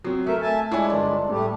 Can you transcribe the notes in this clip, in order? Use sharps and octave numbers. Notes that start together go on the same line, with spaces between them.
F#3 C4
A3 A#4 E5
E5 G#5 A5
G#3 D4 E4 C#5 G#5
G1 D5
A2 G3 A3 G4